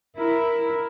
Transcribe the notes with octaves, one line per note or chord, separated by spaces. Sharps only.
E4 A#4